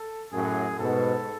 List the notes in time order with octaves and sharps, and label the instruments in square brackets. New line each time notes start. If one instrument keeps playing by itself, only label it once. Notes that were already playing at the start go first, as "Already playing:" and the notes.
Already playing: [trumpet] A4
[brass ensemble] F#2 A2 [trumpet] G#4
[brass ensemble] G#2 B2 [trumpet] A4